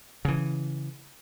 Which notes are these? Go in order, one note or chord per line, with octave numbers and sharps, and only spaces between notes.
C#3 E3